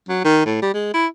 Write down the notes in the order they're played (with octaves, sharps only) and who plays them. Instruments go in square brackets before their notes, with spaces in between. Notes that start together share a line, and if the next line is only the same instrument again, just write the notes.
[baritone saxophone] F#3
D#3
A2
G3
G#3
E4